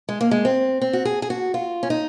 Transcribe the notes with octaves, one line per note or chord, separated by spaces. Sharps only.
G#3
A#3
G#3
C4
C4
F#4
G#4
G#4
F#4
F4
C#4
D#4